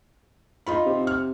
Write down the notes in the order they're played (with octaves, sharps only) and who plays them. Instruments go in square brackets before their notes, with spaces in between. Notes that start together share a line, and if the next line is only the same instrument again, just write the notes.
[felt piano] D#4 F4 B5
[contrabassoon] C3
[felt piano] F6